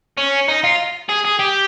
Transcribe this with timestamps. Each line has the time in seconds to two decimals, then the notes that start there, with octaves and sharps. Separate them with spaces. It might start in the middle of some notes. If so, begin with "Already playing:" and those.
0.18 C#4
0.48 D#4
0.64 F4
1.09 G#4
1.25 G#4
1.40 G4